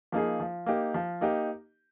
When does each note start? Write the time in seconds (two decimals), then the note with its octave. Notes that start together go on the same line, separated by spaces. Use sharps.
0.12 F3 A#3 D#4 G#4
0.40 F3
0.66 A#3 D#4 G4
0.94 F3
1.21 A#3 D#4 G4